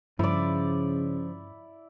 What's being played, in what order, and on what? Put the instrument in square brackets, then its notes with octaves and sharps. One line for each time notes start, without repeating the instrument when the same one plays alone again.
[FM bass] G2 [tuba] C#3 [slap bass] F3 [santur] E4 D5